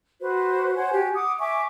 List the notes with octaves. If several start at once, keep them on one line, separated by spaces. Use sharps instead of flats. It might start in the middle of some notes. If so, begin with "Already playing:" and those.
F#4 B4 C5
C5 C#5 F#5 G#5
F#4 G4 G#5
F#5 D6 D#6
E5 G#5 C#6 D6